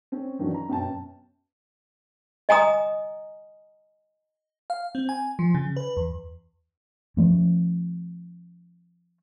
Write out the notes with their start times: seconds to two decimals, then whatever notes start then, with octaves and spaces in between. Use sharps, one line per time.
0.12 C4 C#4
0.39 D#3 E3 F#3 C#4 D4
0.54 A#5
0.69 F#2 B2 G5 A5
2.49 D#5 G#5 A#5 D#6
4.70 F5
4.95 C4
5.09 G#5
5.39 F3
5.54 C#3
5.76 B4
5.97 E2
7.17 F3 A3 C#4